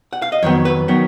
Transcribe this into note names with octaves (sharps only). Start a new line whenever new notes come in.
F#5
F5
D#5
F2 D#3 F#3 B3 C#5
B4
D#3 F#3 B3